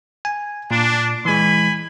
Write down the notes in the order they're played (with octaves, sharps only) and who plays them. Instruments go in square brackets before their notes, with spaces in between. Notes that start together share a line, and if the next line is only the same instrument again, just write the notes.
[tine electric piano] G#5
[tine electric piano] A#2 [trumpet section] D4
[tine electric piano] E3 G#3 [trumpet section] G#5 B5